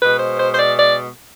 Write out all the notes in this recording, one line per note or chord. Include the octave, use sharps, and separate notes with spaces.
B2 G#3 B4
C5
C5
C5
D5
D5